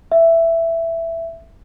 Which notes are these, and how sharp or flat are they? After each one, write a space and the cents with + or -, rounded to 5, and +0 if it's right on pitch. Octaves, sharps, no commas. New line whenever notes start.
E5 +10